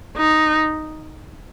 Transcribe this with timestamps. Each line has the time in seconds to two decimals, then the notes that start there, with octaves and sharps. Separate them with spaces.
0.17 D#4